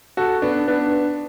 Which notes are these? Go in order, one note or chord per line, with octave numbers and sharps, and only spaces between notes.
F#4 A4
B3 D4
B3 D4